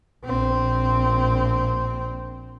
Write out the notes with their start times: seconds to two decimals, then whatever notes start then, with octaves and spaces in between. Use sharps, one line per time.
0.25 A#1 C4